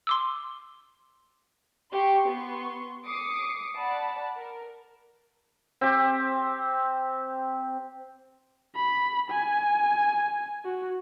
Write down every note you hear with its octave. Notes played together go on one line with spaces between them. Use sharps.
C6 D6 E6
G4 C6 C#6
B3 C6 C#6
D6 D#6 C7 C#7
D5 F#5 A5 B5
A#4
C4 G4
B5
G#5
F#4